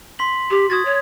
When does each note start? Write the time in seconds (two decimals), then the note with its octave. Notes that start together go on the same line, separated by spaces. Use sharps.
0.19 C6 B6 F#7
0.51 G4
0.70 F#4 D#6 G#6 A6
0.85 C#5